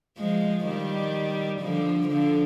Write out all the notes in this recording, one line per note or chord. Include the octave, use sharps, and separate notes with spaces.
F3 G#3
D#3 G3
D3 F3
D3 F3